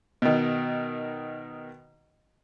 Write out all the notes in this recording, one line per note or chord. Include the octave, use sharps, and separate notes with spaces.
B2 D#3